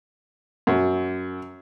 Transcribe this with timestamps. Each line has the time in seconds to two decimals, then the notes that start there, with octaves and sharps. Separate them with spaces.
0.67 F#2